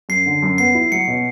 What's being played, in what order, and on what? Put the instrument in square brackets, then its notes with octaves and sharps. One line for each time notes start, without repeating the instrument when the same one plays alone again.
[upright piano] F#2 [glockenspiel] C7
[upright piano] D3
F#2
[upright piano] B3 [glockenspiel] C7
[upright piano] E4
[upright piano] F#3 [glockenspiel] C#7
[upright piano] B2